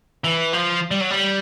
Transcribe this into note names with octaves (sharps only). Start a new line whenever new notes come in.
E3
F3
G3
F#3
G3